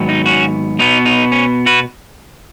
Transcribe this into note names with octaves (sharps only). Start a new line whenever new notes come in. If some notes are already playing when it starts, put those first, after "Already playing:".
Already playing: G#2 D#3 F#3 B3
D#4
C#4 F#4
B2 B3 D#4
D#4
C#4
F#4 B4